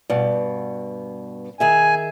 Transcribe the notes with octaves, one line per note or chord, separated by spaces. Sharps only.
G2 B2
D#3 G#4 E5 G#5